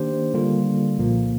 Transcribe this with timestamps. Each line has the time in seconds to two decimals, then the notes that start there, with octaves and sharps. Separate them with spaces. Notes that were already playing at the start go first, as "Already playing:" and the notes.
Already playing: D#3 A#3 D4 G4 C5
0.34 D3 G3 A#3 F4
0.98 C2 A#2 F3 A#3